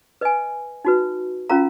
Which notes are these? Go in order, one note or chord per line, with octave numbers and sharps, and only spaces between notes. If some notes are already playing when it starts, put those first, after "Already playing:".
B4 D#5 G#5
D#4 F#4 B4
C#4 F4 A#4 F5 A#5